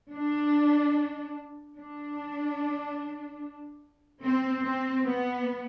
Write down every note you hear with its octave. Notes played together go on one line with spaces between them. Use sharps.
D4
D4
C4
C4
B3